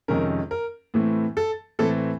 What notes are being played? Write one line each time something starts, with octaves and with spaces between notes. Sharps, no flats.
F2 C3 D#3 G#3 C#4 A#4
A#4
A2 E3 A3 C4
A4
A2 E3 A3 C4 A4